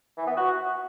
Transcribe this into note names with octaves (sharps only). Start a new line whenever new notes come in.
E3
B3
F#4